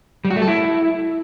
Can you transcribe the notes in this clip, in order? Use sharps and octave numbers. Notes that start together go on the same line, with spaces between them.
G3
F#4
A3
A4
E4